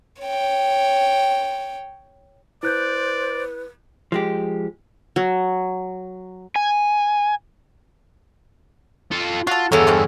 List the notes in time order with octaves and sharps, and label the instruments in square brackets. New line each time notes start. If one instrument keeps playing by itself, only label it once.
[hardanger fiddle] C#5 G5
[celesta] E4 F#6 G6 [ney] B4 [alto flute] C5 [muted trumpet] D5
[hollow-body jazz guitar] F3 G#3 G4
[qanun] F#3
[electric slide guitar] G#5
[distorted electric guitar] F4 A4
[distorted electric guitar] F4 [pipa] F#4 A4
[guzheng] E2 C#5 [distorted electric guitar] G2 D3 [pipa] F#3 A#3 F#4 [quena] A4
[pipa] E3 C4 C#4